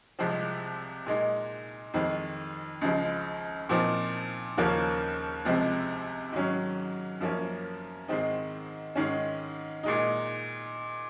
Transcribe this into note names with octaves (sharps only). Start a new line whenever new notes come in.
C2 C3 F3 G#3 C4
A#2 G#3 D#4
F2 D#3 G#3 C4
C#2 C#3 F3 G#3
A#2 F3 C4 D#4
D#2 C#3 F3 A#3 C#4
C#2 C3 F3 G#3 C4
G#2 D#3 F#3 C#4
F#2 F3 A#3 C#4
G#2 D#3 G#3 C4 D#4
G#2 D#3 G#3 C#4
A#2 G#3 D#4